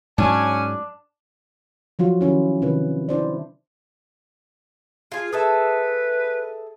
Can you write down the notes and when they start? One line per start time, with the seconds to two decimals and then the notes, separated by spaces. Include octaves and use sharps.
0.18 G#2 F#3 C#4 D4 G#5
1.99 F3 F#3 F4 F#4
2.21 D#3 F#3 C#4 E4
2.62 C3 D#3 E4 B4 C#5
3.09 D4 E4 C5 D5
5.12 F4 G#4
5.32 G#4 A4 B4 E5